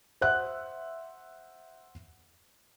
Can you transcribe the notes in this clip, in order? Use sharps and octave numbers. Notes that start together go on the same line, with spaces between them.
C5 E5 F#5 F#6